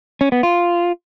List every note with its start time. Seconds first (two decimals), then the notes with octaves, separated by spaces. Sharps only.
0.21 C#4
0.32 B3
0.43 F4